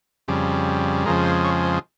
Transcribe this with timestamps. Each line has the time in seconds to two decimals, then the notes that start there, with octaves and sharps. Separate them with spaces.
0.28 F2 C#3 G3
1.05 F2 C#3 F3 G#3 A#4
1.25 C5
1.44 C#5
1.63 C5